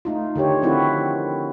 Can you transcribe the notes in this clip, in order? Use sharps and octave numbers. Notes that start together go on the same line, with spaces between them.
A3 D#4 F4
D3 D#3 G4 C#5
D#3 F3 C4 E4 F#4